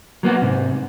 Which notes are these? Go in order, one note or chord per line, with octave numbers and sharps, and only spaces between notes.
F#3 A#3 B3 F#4
G#2 C3